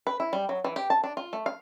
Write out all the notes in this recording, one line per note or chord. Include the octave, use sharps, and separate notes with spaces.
B4
E4
G3
F#3
E3
G4
A5
D4
F4
A3
F5